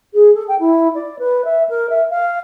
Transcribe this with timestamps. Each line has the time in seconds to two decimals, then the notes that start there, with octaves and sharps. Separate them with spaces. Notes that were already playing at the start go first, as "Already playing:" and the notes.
0.14 G#4
0.35 A4
0.48 G5
0.59 E4
0.95 D5
1.19 B4
1.45 E5
1.69 A#4
1.90 E5
2.10 F5